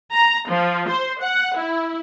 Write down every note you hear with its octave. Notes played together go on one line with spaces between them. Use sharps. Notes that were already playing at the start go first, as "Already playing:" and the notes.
A#5
F3
C5
F#5
E4